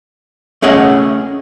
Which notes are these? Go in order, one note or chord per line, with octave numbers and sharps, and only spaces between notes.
A3 C#4 G#4 D#5 F#5